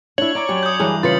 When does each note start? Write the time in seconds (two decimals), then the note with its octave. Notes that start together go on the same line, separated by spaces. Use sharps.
0.18 D4 E4 C#5 F#7
0.35 E4 D5 A#5 D6
0.49 F#2 G4
0.63 D#6 G6
0.80 G2 E3 G#4 A#4
1.03 C#3 F4 B4 A6 C#7 F#7